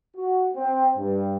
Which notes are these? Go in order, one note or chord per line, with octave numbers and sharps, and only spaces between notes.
F#4
C4
G2